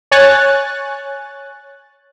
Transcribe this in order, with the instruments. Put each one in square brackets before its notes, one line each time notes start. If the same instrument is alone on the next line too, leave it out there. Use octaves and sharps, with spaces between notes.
[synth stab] C#5 G#5 F#6 A6